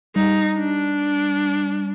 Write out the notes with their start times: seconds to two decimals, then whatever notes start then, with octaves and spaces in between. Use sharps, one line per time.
0.16 G3 D#4
0.57 D4